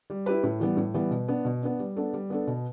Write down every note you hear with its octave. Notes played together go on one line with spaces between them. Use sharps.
G3
E4 G4 B4
A2
E3 G3 B3
A2
E3 G3 B3
B2
B3 D4
B2
B3 D4
G3
B3 D4 A4
G3
B3 D4 A4
B2